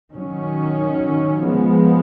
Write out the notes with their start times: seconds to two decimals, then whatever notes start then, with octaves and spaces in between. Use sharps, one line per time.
0.12 D#3 F#3 C#4
1.44 F3 G#3 B3